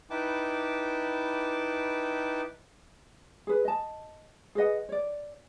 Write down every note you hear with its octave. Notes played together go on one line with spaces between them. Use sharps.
D#4 E4 B4 G5 A5 D6
G#4 B4
D#5 A5
G#4 B4 D#5 F#5
C#5 D5